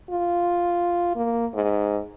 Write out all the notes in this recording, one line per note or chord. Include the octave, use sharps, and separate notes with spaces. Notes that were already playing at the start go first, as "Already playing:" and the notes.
F4
A#3
G#2